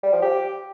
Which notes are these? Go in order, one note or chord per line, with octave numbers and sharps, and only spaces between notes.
G3
F3
G4